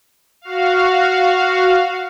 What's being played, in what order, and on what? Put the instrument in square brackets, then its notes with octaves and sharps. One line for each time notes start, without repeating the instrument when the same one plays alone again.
[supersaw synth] F#4 F5